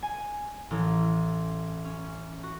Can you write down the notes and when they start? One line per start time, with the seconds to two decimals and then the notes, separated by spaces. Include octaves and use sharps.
0.02 G#5
0.71 A1
1.85 C#4
2.43 F#4